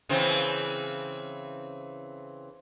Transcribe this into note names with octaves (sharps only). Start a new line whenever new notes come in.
C#3 E3 C4